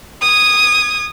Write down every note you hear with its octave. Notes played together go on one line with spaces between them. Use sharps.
D#6 G#6